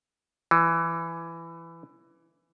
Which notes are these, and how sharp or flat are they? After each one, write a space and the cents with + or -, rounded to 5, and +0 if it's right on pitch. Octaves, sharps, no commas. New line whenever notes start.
E3 +15